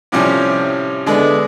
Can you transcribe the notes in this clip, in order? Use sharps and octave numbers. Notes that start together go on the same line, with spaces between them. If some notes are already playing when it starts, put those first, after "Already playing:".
A2 C3 F3 G3 C#4
D3 G#3 A3 B3 D4